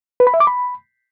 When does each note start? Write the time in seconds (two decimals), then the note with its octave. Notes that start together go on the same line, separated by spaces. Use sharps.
0.20 B4
0.27 B5
0.34 E5
0.40 D6
0.47 B5